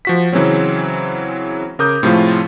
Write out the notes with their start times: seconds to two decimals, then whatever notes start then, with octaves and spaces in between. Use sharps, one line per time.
0.05 F3 F#4 B6
0.32 C#3 E3 F#3 G#3 C4 C#4
1.79 C#3 A#4 D6 D#6 G6
2.03 A2 C3 F3 G#3 A3 F4